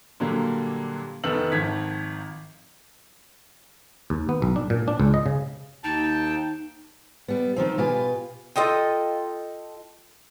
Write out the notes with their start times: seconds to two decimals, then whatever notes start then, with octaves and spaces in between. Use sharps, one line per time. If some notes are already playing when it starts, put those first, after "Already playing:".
0.20 A#2 D3 F#3 G3 A#3
1.24 F1 D#3 B3 A4 E6 F#7
1.52 G#1 D#3 F3 G#6 B6
4.10 D#2
4.29 B3
4.42 B1
4.56 D4
4.70 A#2
4.88 D4
5.00 C#2
5.14 D#5
5.26 C#3
5.84 D#2 D#4 G5 A5
7.28 G3 B3
7.56 D#3 F3 C4
7.78 B2 F4 G4 B4 G#5
8.56 F4 A4 D#5 G5